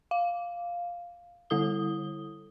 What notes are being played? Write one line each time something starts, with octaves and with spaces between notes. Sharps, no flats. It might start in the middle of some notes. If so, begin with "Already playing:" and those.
F5
D3 G3 E4 A4 D#6 G7